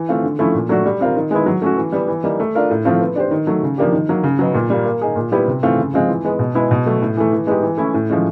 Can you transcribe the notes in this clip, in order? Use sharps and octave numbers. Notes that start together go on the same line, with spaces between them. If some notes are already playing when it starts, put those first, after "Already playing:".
Already playing: E3
A3 C4 F4
D3
F3 A3 C#4 E4
A#2
F#3 A3 D4 F#4
G3
C4 F4 A#4
D#3
G#3 B3 E4
F#3
A3 C#4 F#4
E3
G3 B3
E3
G3 A#3 D#4
A3
D4 F4 A#4
A2
F3 A3 C4 F4
B3
D4 G4 C5
D#3
F#3 A3
C#3
F3 A#3 D4 G4
D#3
F#3 A#3
C#3
F#3 B3 D#4
A#2
G3 A#3
A#3
D#4 G#4
A#2
G3 B3 E4 G4
C3
E3 A3 C4 F4
C#3
F3 G#3 C4 F4
E3
G#3 B3
B2
G#3 B3 E4 G#4
B2
F#3 A3
A2
E3 A3
E3
G#3 B3 D#4 G4
E3
A3 C#4 E4
A2
F3 G#3 C#4